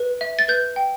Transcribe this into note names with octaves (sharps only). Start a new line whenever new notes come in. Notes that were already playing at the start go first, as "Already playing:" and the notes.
Already playing: B4
E5
A6
B4 G6
G5